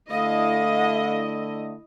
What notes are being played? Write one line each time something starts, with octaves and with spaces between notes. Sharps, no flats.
D3 A3 E4 D#5 F5